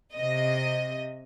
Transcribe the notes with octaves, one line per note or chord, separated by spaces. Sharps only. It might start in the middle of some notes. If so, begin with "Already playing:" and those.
C3 D#5